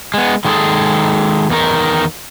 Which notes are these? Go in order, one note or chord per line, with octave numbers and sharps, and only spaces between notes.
G#3 B3
D#3 G#3 C#4 D#4 G#4 A4
E2 D#3 A#4